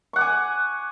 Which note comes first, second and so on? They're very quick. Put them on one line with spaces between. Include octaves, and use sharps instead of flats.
C#6 F#5 D6 G#5